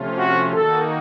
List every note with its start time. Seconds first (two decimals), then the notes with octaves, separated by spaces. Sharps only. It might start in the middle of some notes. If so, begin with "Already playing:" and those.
Already playing: C3 F3 A3 C#4 F4
0.17 F#4
0.53 D#3 A#3 D#4 F#4 A4